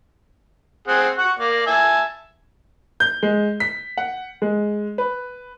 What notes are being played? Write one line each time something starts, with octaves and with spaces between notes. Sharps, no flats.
C4 G#4 F#5
F#5 C#6
A#3 D5
E5 G#5 A5
G6
G#3
B6
F#5
G#3
B4